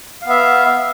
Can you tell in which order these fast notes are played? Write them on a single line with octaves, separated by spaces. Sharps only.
F5 B3 E5